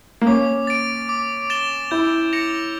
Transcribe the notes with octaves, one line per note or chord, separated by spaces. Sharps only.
A#3
C#4 D6
A6 D7
D6
A6 E7 G7
E4 G6
A#6 C#7 F7